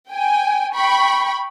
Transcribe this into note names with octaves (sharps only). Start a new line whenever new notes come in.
G5 G#5
G5 B5 C#6